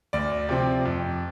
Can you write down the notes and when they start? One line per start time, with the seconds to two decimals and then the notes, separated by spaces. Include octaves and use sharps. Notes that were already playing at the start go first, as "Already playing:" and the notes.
0.13 D2 D5
0.49 C3 F3 C4
0.85 F2